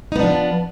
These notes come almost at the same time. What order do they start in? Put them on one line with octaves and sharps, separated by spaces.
D#4 B3 D4 F3